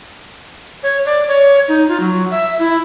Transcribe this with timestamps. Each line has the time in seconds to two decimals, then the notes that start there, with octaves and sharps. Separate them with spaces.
0.83 C#5
1.06 D5
1.28 C#5
1.68 D#4
1.89 F4
2.00 F#3
2.31 E5
2.59 E4